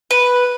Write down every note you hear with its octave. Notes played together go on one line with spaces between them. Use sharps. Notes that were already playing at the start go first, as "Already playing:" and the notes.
B4